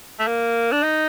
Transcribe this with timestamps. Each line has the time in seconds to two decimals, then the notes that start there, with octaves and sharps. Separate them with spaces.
0.19 A3
0.27 A#3
0.72 D4
0.83 D#4